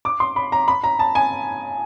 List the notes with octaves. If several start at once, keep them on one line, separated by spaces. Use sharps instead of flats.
D6
C6
B5
A#5
B5
A#5
A5
G#5